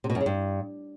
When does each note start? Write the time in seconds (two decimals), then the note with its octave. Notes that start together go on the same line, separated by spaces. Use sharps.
0.04 C3
0.10 B2
0.15 F#2
0.21 C#3
0.26 G2